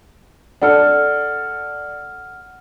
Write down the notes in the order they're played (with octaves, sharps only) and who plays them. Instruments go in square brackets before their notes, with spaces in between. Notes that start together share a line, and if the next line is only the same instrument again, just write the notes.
[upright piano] D4 A4 [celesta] F#5 F6